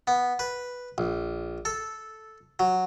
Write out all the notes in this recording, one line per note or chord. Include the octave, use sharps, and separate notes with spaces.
B3
B4
A#1
A4
F#3